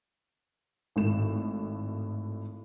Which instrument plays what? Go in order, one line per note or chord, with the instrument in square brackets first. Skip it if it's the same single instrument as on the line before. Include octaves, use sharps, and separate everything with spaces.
[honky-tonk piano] G#1 A2 E7